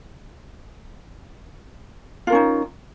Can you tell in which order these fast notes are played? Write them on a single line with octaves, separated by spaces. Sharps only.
F4 A#4 C#4 D#4